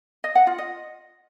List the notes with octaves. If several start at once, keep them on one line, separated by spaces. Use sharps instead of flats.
D#5
F#5
F4
D#5